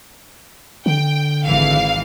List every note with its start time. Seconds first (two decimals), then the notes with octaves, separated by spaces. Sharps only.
0.86 D3 G5
1.44 G#1 E3 F5